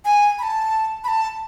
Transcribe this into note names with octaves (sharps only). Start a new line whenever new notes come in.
G#5
B5
A5
B5
A5